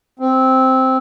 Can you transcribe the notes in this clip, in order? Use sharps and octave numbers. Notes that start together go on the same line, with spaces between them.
C4